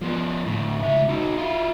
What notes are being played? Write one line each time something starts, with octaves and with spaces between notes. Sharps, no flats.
F3 B3
D2 A2
C#2 E5
D#4 F#4
E4 F4